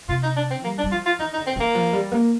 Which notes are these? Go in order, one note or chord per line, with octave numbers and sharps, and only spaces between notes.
C3 F4
D#4
D4
C4
G3 A#3
D4
G3
F3 F4
F4
D#3 D#4
D#4
D3
C4
D#3 A#3
F3
G3
A#3